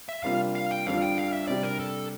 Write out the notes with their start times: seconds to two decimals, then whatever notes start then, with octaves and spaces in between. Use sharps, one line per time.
0.09 E5
0.23 C3 G3 A#3 D4 F4 F5
0.55 F5
0.71 G5
0.86 F2 D3 G3 D4 F4 F5
1.02 G5
1.18 F5
1.33 E5
1.47 C3 G3 D4 G4 D5
1.63 A#4
1.79 A4